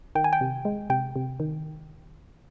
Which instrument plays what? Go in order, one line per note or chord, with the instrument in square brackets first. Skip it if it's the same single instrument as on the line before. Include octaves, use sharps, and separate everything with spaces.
[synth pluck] D#3 G5
G#5
G5
C3
G#3
C3 G5
C3
D#3